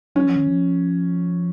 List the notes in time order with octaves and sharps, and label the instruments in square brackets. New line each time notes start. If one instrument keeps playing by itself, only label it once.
[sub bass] F#3 [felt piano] C#4
[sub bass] F3
D#3
F3